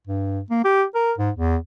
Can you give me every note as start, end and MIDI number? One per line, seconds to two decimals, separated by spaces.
0.08 0.41 43
0.51 0.61 58
0.65 0.84 67
0.95 1.13 70
1.18 1.31 44
1.36 1.57 40